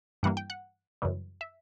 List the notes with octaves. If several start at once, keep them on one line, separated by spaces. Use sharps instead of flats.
G2 E3 G3 A#3 F#5
G5
F#5
F#2 C#3 E3 G3
E5